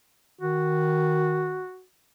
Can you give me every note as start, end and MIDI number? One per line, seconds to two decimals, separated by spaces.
0.41 1.63 51
0.41 1.84 66